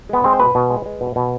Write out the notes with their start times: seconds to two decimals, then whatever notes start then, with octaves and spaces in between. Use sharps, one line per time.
0.09 G#3 B3
0.24 G#3 C4
0.33 C5
0.40 B2 B4
0.55 B2
0.70 G#3
0.86 G#3
1.01 B2
1.16 B2